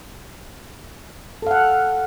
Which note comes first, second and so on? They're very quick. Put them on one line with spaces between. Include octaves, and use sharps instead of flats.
A4 F5 F#5